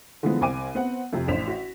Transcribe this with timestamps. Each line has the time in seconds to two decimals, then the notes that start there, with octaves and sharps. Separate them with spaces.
0.23 D3 E3 F3 G#3 B3
0.41 C2 C4 G#5 D6 D#7
0.75 B3 C4 F#5
1.13 F2 C3
1.28 A1 D4 C5 B6 E7 F7
1.48 F#4